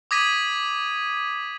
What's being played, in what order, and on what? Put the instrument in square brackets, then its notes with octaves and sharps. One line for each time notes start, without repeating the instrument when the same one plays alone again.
[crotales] D6 D#6 G#6 A#6 B6 D#7